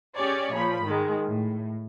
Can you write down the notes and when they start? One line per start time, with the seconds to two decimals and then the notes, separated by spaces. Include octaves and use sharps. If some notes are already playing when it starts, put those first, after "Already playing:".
0.16 C#4 G4 G#4 C#5 D5
0.54 A#2 F3 B5
0.84 G#2 D#3 G#3
1.29 A2